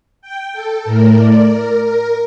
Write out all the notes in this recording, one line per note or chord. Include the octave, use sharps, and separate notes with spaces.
G5
A4
A2 A3 A#4
D5
A#4
A#4